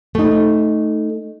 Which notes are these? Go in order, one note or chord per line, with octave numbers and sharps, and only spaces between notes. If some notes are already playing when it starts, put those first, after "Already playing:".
A3 D#4